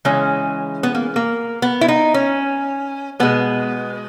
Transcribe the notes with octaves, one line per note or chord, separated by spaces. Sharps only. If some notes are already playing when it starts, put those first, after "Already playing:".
C#3 E3 G#3 C#4
B3
A#3
A#3
B3
E4
D#4
C#4
B2 G#3 B3